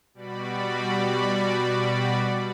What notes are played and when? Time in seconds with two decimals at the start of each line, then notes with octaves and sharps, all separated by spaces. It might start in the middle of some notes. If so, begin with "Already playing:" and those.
0.14 B2 G3 F#4 D5 B5